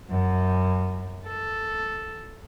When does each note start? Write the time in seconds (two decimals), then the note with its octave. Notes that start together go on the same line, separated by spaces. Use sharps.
0.11 F#2
1.26 A4